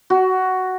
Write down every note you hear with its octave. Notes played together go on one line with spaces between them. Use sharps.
F#4